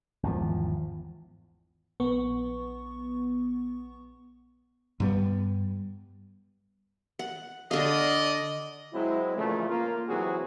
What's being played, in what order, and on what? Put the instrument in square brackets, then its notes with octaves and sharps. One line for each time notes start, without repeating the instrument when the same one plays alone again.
[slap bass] G#1 E2 F3
[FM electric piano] A#1 B3 C#6
[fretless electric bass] G2 G3 B3
[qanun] F#5
[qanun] D3 F5 [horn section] D5 D#5
[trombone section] F#3 G#3 C4 E4
A#2 C#3 E3 F3 A3
A#3 F4
C3 E3 F#3 C4 F#4 G#4